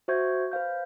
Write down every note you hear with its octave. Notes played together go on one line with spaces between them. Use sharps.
F#4 C5 E5 C#6 G6 G#6
B4 C5 F5 G6